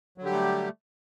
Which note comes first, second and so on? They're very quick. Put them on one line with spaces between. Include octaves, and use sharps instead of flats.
F#3 D3 G4 G3 A3